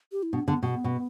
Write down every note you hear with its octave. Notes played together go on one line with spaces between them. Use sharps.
G4
E4
B2 D4
D3 B3
B2 B3
B2